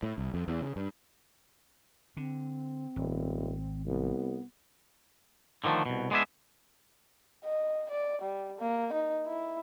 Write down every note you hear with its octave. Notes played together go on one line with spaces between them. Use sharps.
A2
C2
F2
E2
C#3
G2
D3 C4
D#1 G#1
C2 B3
D3 D#3 F3 G3 A3
C2 B2
G#3 B3 D4 G#4 E5
D#5
D5
G3
A#3
D#4
E4